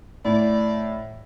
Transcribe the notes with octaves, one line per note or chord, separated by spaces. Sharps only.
A2 D5